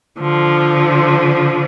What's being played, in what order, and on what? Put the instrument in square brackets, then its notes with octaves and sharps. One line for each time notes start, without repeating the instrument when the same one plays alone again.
[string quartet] D3 F3